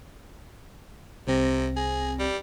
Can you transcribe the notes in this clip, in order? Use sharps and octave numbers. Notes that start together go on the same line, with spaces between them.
C2 C3 C4 A#6
G#4
G3